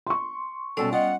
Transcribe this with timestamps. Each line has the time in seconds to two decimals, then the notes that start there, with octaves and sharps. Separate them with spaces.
0.07 C6 C#6
0.77 F#2 B2 G3 C#4 A4 D5
0.93 F4 D#5 F#5